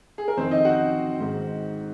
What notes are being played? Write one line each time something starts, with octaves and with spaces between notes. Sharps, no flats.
G#4
A#4
F2 C3 D#3 C4 C5
D#4 D#5
F#4 F#5
G#2 D#3